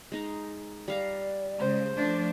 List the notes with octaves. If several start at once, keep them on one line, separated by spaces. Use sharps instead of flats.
G#3 D#4 A#5
G3 D5 F5 A#5
C#3 G#3 C5
F3 A3 D4